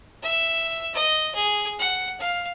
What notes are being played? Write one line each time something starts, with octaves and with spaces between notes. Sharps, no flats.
E5
D#5
G#4
F#5
F5